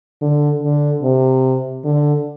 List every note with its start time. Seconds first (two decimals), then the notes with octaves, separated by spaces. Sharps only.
0.22 D3
0.62 D3
1.02 C3
1.85 D3